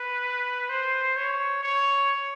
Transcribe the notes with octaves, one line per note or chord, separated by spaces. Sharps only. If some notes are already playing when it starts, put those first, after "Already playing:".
Already playing: B4
C5
C#5
C#5